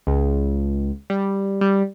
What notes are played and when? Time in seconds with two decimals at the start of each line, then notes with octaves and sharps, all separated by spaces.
0.07 C#2
1.10 G3
1.61 G3